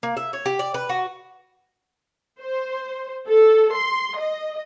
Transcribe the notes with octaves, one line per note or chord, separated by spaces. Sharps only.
A#3
E5
C#5
G4
D5
B4
F#4
C5
A4
C6
D#5